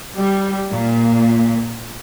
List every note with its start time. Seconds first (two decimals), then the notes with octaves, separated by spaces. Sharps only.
0.17 G3
0.72 A#2